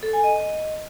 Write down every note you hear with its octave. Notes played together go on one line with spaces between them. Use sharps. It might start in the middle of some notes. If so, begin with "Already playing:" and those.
A4
G#5
D#5